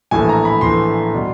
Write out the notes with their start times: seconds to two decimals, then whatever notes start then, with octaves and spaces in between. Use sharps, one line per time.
0.11 A#1 A2 E3 A3 G#5
0.29 A#5
0.45 B5
0.61 A#1 A2 E3 A3 C6
1.14 B2 G3